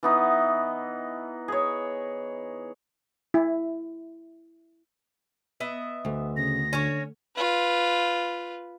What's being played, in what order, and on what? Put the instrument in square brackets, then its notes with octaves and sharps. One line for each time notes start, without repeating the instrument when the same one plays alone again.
[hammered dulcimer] E3 B3 D#4
G#4 C#5
[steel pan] E4
[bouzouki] B3 D#5 E5
[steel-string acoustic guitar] D2
[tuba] C#3 [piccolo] A#6
[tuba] D3 [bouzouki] C#4 C#5
[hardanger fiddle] F4 B4